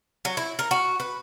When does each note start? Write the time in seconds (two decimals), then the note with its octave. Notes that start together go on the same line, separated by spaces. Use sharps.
0.25 F#3
0.37 E4
0.59 A#4
0.71 F#4
1.00 B4